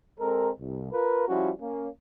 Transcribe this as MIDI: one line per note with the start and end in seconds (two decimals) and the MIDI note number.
0.20 0.50 56
0.20 0.50 60
0.20 0.50 69
0.20 0.50 70
0.60 0.90 36
0.92 1.28 65
0.92 1.28 70
0.92 1.28 71
1.28 1.51 53
1.28 1.51 55
1.28 1.51 61
1.28 1.51 64
1.28 1.51 66
1.61 1.87 58
1.61 1.87 61